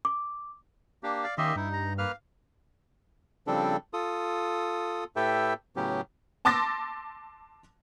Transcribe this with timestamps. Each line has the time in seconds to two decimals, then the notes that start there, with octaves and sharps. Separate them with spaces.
0.05 D6
1.03 A#3 D4 G4
1.24 D5 F5
1.38 D#3 A#3 C#4 G4 D#5 E5 C6
1.56 G2 D#4 E4
1.73 A#5
1.98 A#3 B4 F5 F6
3.47 C#3 F3 G3 C4 D4 A4
3.93 F4 A4 D#6
5.16 A2 G4 A4 B4 E5 G5
5.76 A2 C#3 F#3 B3 C#4 G4
6.45 A5 C6 D6 E6 A6 A#6